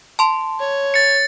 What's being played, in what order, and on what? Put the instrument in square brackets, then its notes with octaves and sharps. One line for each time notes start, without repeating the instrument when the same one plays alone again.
[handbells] A5 C6
[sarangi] C#5
[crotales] A6 C#7